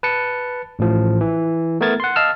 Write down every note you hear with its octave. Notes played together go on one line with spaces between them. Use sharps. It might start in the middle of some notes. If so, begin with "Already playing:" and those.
B4 A5 C#7
A1 A2 F3
E3
A3 B3 A#4 G#6 A6
F#5 C6
D#5 F5 A5 E6 F6